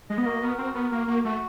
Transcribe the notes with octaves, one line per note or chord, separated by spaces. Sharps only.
G#3 D#5
B3
A#3 F#4
B3 A#4
C4 F#4
B3 A#4
A#3 F#4
A#3 F#4
A3 F#4